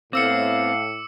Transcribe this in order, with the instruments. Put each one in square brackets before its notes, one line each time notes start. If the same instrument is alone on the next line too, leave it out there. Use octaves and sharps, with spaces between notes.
[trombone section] A2 [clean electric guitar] B3 C4 [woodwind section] F5 [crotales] D6 E6 C#7